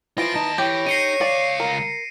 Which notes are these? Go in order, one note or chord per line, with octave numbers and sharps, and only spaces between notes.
E3 F4 C5 A#6 D7
D#2 D#4 A5
E3 G4 C#5
D#4 C7 C#7 D#7
C#2 D5 F5
A#4